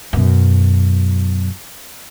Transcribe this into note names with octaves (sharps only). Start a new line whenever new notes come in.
F#2 B2